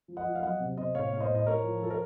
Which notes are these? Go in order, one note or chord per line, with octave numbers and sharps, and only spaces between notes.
F3
D#5 F#5
F3
F5
F#3 D#5 F#5
C3
C3 C5 D#5
A2 C#5 F5
A2 F5
C5 D#5
A2
D#5
A2 A#4 C#5
F3
F3 A4
A#4